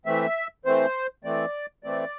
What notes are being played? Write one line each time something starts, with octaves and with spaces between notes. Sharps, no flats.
E3 A3 C4 E5
E3 A3 C4 C5
E3 A3 C4 D5
E3 A3 C4 D5